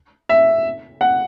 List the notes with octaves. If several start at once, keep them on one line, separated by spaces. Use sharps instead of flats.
E5
F#5